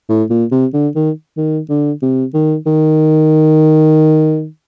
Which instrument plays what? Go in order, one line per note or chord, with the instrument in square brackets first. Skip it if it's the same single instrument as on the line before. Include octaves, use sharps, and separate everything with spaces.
[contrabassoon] A2
A#2
C3
D3
D#3
D#3
D3
C3
D#3
D#3